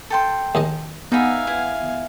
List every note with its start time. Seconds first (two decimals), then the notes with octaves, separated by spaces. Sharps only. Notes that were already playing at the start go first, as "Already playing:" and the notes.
0.10 A4 G5 C6
0.55 D#2 G#3 D#5
1.12 B3 D#4 G#4 E5 F5 G#5
1.47 E4